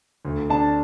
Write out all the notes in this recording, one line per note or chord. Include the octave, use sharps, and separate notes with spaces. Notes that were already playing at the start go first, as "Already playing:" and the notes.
D2
D4 A5